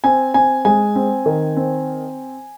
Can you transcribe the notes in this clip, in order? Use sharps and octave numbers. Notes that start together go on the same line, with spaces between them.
C4 G#5
C4 G#5
G#3 G#5
C4
D#3
C4